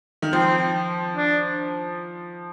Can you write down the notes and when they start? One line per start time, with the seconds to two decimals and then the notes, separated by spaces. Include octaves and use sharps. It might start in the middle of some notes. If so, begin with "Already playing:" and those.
0.22 D#3
0.32 F3 C4
1.15 D4